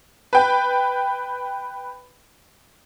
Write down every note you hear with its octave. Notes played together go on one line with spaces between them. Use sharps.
B4 G5